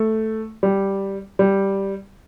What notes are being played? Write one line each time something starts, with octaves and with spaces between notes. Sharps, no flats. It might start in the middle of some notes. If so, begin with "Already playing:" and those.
Already playing: A3
G3
G3